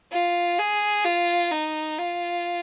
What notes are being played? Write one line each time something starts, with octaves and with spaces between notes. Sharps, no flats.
F4
G#4
F4
D#4
F4